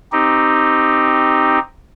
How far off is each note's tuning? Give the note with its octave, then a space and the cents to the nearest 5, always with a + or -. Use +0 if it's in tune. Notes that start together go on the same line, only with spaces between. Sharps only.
C4 +0 D#4 -5 G4 +0